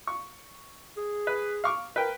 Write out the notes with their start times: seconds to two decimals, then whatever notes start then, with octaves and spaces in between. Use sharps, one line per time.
0.07 C#6
0.97 G#4
1.27 B4
1.64 F5 C#6 D6
1.96 A#4 B4 G5